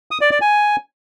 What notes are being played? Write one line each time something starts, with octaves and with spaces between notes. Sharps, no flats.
D#6
D5
D5
G#5